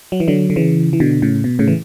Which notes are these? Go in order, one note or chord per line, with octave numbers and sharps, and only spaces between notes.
F#3
E3
D3 F#3
D3
C#3 E3
E3
B2 D3
A2 C#3
B2
A2 C#3
E3